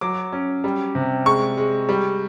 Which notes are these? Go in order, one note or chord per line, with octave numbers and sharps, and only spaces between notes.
F#3 D6
C#4
G3
C3
G#3 C#6
G#3
G3